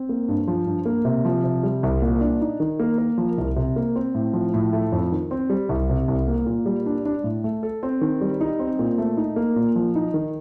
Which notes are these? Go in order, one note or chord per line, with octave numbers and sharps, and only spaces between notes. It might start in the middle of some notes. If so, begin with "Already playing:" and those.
Already playing: C4
A#3
G2
F3
G2
A#3
C3
F3
C3
G3
C2
A#2
D4
D#4
D#3
A#3
A#4
F3
C2
C3
A#3
C4
A2
F3
A2
A3
F2
D#3
C4
G3
C2
C3
C2
A#3
A#2
G3
D4
D4
A2
A3
A4
C4
D#3
G3
D#4
C4
A#2
A3
D#4
A#3
A#2
F3
D#4
D#3